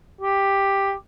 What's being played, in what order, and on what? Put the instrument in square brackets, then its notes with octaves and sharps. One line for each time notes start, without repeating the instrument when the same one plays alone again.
[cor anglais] G4